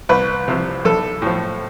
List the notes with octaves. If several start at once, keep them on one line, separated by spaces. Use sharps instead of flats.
C2 B4
C3 F3
B1 A4
A2 F3